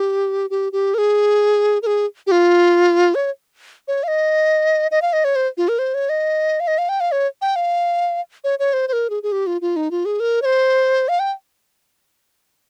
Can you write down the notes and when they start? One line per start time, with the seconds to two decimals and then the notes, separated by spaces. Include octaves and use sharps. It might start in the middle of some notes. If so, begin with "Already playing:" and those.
Already playing: G4
0.50 G4
0.72 G4
0.94 A#4
0.98 G#4
1.82 A#4
1.87 G#4
2.27 G4
2.32 F4
3.15 C#5
3.88 C#5
4.03 F5
4.08 D#5
4.91 D#5
5.02 F5
5.13 D#5
5.24 C#5
5.36 C5
5.57 F4
5.69 A#4
5.79 C5
5.94 C#5
6.09 D#5
6.60 F5
6.67 D#5
6.78 F5
6.89 G5
7.00 F5
7.12 C#5
7.42 G5
7.56 F5
8.44 C#5
8.59 C#5
8.73 C5
8.88 C5
8.93 A#4
9.10 G#4
9.23 G#4
9.32 G4
9.47 F4
9.61 F4
9.76 D#4
9.91 F4
10.05 G#4
10.20 A#4
10.42 C#5
10.45 C5
11.08 F5
11.19 G5